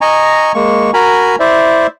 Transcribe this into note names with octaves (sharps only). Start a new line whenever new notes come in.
D#5 G#5 A#5 C#6
G#3 A#3 C#6
F#4 A#4 G#5 A#5 B5
E4 C5 D5 E5